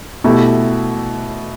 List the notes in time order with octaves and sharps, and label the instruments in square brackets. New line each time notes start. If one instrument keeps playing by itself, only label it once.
[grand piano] B2 A3 E4 G4